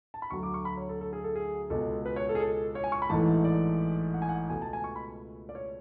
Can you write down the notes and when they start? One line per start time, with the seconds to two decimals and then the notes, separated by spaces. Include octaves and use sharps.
0.14 A5
0.22 B5
0.30 D2 D3 F#3 A3 C#6
0.43 D6
0.54 C#6
0.65 B5
0.77 C#5
0.89 A4
1.01 A4
1.13 G#4
1.24 A4
1.35 G#4
1.70 C#2 B2 G#3 A4
2.06 B4
2.16 C#5
2.29 A4
2.35 G#4
2.40 A4
2.75 C#5
2.84 G#5
2.92 C#6
3.02 B5
3.09 A1 G#2 E3 A3 A5
3.44 D5
4.14 F#5
4.22 G#5
4.29 F#5
4.50 C#2 B2 A3 G#5
4.62 A5
4.73 G#5
4.84 C#6
4.96 B5
5.49 D5
5.55 C#5